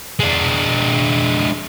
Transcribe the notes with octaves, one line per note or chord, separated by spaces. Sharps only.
G#3 D4